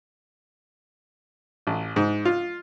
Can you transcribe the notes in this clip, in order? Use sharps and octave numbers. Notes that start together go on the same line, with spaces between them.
A1
G#2
F4